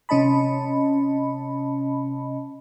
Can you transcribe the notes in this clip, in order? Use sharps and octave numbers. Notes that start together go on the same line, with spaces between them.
C3 C#4 D#5 A5 B5